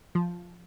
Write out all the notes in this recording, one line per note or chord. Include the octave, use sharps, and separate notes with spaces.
F3